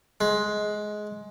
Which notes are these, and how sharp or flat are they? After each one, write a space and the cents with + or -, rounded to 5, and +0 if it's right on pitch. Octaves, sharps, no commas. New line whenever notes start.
G#3 +15